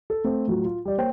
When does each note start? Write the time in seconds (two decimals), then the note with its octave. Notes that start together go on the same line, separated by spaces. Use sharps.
0.10 A4
0.25 A3 C4
0.47 A2 F#3 F4 F#4
0.65 F4
0.85 G3 D5
0.98 A#3 C5 C#5 G5